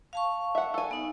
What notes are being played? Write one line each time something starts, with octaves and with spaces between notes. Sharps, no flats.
F5 A5 C#6
E5 F#5
A4 G#5
B3 D#4